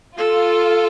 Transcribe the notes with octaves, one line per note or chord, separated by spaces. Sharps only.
F4 A4